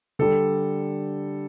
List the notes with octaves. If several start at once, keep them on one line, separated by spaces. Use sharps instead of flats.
D3 G3 A4